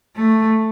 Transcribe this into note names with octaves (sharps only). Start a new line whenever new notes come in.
A3